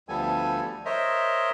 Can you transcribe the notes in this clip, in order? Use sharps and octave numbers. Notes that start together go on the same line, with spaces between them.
D2 F3 G3 B3 A4 G#5
A#4 C5 C#5 D#5 E5